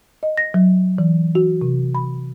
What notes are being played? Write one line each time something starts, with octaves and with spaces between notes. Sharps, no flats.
D#5
A#6
F#3
E3
F#4
C3
B5